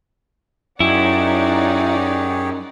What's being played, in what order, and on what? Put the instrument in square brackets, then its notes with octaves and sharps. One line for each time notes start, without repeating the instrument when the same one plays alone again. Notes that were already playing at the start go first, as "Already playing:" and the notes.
[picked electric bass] F#2 [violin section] D#4 D5 F#5 [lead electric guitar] E4 [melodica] G4 G#4 C#5